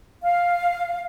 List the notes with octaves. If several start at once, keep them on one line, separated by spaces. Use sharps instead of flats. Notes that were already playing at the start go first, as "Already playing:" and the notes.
F5